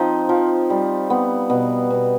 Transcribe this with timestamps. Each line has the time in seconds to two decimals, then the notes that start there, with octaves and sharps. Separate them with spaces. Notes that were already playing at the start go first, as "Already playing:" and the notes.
Already playing: F3 C4 D#4
0.29 F3
0.70 G3
1.10 B3
1.50 B2
1.90 B2